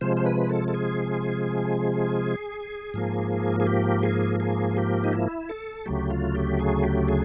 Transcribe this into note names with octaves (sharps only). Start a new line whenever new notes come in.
C3 F3 G#3 C5
C5
B4
A4
A4
G#4
G#2 F3 A#3
G#4
G4
G#4
G#4
G4
D#4
E4
A4
D2 C#3 F#3 A3 G4
F4
G4
G#4
G4
G#4